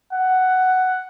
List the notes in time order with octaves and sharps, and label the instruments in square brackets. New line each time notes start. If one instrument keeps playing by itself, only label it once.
[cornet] F#5